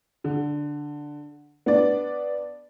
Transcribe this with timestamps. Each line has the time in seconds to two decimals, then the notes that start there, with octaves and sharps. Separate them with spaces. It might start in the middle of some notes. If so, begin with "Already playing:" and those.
0.24 D3
1.66 B3 D4 D5